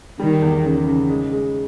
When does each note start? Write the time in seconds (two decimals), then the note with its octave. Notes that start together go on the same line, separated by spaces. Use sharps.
0.19 D#3 G3
0.42 E2
0.65 C#3
0.87 C#3
1.09 G#3
1.32 G#3